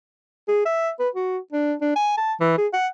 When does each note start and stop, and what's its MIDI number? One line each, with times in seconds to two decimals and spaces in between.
0.48 0.63 68
0.65 0.91 76
0.99 1.09 71
1.15 1.38 66
1.52 1.75 62
1.81 1.93 62
1.96 2.13 80
2.17 2.33 81
2.40 2.54 52
2.58 2.67 68
2.73 2.87 78